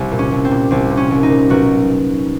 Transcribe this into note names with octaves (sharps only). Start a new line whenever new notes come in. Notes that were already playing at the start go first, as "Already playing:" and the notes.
Already playing: C2
A#2
C#4
C2
C4
A#2
C2 C4
A#2
C#4
C2
D#4
A#2
B1 F#4